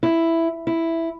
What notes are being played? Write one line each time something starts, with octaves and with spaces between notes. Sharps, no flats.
E4
E4